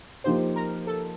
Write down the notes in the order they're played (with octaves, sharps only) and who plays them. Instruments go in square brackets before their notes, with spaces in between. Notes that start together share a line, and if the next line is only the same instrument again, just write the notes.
[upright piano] F3 A#3 D#4 G4 [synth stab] C5
[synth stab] A#4
A4